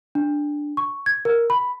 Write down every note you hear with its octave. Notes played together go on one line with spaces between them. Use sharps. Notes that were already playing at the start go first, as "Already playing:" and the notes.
D4
C#6
G#6
A#4
B5